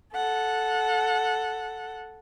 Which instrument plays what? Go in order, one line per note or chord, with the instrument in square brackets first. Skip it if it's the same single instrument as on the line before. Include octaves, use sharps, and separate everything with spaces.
[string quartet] A4 F#5